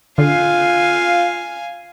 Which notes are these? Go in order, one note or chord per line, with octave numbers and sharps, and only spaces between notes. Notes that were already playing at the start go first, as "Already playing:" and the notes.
D3 F4 F5 G#5